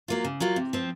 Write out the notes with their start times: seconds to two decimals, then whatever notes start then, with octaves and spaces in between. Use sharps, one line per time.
0.08 F#3 A#3 F4
0.25 C#3
0.40 F#3 A#3 F4
0.56 C3
0.73 F3 C4